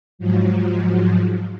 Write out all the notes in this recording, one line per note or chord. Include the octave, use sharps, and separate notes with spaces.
G#2 F3 F#3